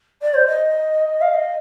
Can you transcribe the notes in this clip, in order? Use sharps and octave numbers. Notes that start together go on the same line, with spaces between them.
D5
C5
D#5
F5
D#5